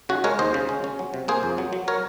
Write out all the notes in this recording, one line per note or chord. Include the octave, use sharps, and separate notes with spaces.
C#3 F#4
G#3 A#4 C#5
D#2 C5 D#5
C#3
C#4
C#4
F#3
C3
A#3 G#4 C5
F2
F#3
F#3
A#4 C#5